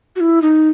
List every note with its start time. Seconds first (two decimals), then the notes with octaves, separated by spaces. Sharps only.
0.16 F#4
0.20 E4
0.42 D#4